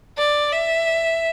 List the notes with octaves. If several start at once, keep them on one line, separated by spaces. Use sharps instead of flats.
D5
E5